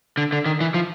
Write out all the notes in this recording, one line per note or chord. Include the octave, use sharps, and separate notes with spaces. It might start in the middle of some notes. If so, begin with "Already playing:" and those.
D3
D3
D#3
E3
F3